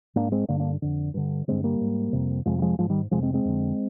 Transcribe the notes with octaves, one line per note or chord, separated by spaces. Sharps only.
G#2 A#3 D4
G#3 C4
G2 D3 A#3 D4
A#3 D4
F2 D3
G2 D3
G2 D3 G#3 C4
G3 A#3
G#2
F2 C3
F2 C3 F3 G#3
G3
F3 G#3
G#2 F3 G#3
D#3 G3
F2 C3 F3 G#3
G#3 C4
G#3 C4
F2 D3